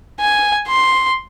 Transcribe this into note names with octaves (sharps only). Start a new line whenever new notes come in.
G#5
C6